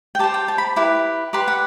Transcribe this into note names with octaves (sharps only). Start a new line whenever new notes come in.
G5
G4 C5 A5
G5
A5
B5
E4 G4 B4
G4 B4 D5 C6
F#5